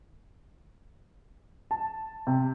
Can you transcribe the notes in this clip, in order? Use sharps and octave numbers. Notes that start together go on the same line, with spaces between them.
A5
C3